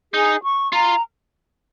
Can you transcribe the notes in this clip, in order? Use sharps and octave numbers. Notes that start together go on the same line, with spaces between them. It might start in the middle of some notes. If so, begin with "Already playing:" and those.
D#4 G#4
C#6
F4 A#5